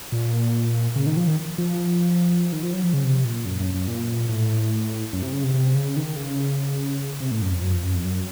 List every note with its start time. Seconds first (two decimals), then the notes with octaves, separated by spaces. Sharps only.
0.12 A#2
0.96 C#3
1.06 D#3
1.17 F3
1.27 D#3
1.58 F3
2.52 D#3
2.63 F3
2.73 F#3
2.83 F3
2.93 C#3
3.04 C3
3.25 A#2
3.46 F#2
3.60 F#2
3.74 F#2
3.88 A#2
4.29 A2
5.13 F#2
5.22 C3
5.33 C#3
5.44 C3
5.54 C3
5.75 C#3
5.96 D#3
6.16 C#3
7.20 C3
7.31 A2
7.42 F#2
7.52 F2
7.63 F#2
7.73 F2
7.84 F#2
7.94 F2
8.05 F#2